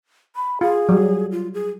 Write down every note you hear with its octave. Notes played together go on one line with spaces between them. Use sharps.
B5
F4 G#4
F#3 G3
F4
G#4